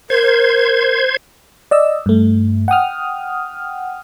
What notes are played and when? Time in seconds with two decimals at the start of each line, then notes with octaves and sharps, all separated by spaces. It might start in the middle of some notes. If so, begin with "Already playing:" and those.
0.10 A#4 C5 G#6
1.71 D5 D#5 E6
2.06 G2 A3
2.68 F#5 G5 D#6 F6